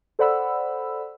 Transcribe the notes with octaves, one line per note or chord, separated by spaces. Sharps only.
A4 C5 D5 F#5 B5 E6